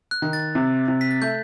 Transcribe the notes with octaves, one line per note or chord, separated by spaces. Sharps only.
F#6
D#3
A6
C3
C3
B6
A6
A3 G6